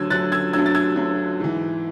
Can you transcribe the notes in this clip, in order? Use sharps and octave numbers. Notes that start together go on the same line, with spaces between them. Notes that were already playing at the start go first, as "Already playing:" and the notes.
Already playing: D2 D3 F#3 E6 G#6
D2 D3 F#3 F#6 A6
E6 G#6
D2 D3 F#3 E6 G#6
A6
E6 G#6
D2 D3 F#3
G#2 E3